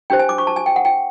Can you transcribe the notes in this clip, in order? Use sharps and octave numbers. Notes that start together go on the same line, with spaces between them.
D4 G4 C5 G5
G#5
D6
C#6
A5
G#5
G5
F#5
G5